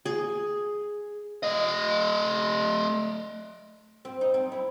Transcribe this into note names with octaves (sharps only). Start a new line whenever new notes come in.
G#4
A3 D#5
C4
D#4
C4
E4